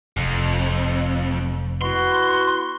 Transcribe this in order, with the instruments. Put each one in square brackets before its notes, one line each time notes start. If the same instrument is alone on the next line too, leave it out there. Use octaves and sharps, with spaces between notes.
[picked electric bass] F1 [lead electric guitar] F2
[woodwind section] B3 E4 F#4 [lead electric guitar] C6